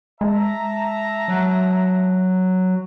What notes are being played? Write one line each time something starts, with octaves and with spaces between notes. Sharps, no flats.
G#3 E5 A5 A#5
F#3